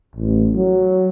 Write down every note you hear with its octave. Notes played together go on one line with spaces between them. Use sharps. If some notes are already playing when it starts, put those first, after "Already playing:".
A1
F#3